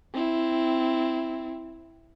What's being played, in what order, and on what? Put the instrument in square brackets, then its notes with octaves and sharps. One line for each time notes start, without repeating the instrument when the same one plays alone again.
[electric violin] C4 E4